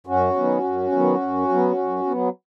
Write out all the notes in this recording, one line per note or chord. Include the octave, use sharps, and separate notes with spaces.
F#2 C#4 F#4
D#3 F#3 B3
F#2
D#3 F#3 B3
F#2
F#3 B3
F#2
F#3 B3